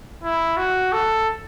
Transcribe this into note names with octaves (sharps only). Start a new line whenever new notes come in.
E4
F#4
A4